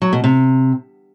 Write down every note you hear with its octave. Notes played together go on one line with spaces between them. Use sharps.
F#3
B2
C3